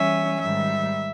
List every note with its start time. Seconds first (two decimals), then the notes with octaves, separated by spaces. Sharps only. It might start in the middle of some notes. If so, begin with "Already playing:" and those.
Already playing: E3 G3 C#4 E5
0.42 G#2 D#3 G3 E5